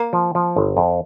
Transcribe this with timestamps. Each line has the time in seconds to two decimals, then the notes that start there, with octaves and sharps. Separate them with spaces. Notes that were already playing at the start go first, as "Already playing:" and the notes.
Already playing: A#3
0.13 F3
0.35 F3
0.56 G1
0.77 F2